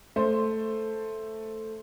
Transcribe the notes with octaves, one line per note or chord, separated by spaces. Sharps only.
A3 C5